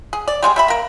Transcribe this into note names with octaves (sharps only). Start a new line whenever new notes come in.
G#4
D5
G3 G#3 E4 G#4
G3 E5 B5
A#3 A#4